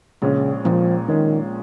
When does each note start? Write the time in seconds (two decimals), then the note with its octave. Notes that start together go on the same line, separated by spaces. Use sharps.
0.22 A#1 A#2 C#3 G#3 C#4
0.64 A#1 A#2 F3 G#3 C#4
1.08 A#1 A#2 D#3 G#3 C#4